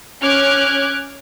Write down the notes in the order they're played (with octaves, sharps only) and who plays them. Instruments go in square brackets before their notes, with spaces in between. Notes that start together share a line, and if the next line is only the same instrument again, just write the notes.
[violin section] C#4 D6 F6 F#6 G#6